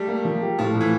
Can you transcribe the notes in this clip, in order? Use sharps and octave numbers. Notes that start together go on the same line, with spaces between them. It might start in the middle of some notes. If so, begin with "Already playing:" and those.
Already playing: G3 A3
A#3
F3
G4
A2 F3
A2
E3